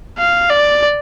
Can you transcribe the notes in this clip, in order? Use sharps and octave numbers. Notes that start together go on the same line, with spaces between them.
F5
D5